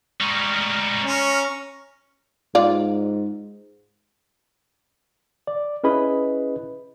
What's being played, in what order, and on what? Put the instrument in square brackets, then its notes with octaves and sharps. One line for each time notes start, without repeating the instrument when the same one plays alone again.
[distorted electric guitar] G3 G#3 [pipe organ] A#5 C#6 F6
[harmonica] C#4
[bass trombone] G#2 [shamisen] F4 D5
[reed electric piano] D5
C#4 E4 G#4 B4 D#5 B5